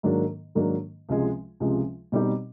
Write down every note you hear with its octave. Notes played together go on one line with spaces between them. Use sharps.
G#2 D#3 F#3 A#3 D4
G#2 D#3 F#3 A#3 D4
C#2 C3 F3 G#3
C#2 C3 F3 G#3
B2 G3 C4 D#4 G4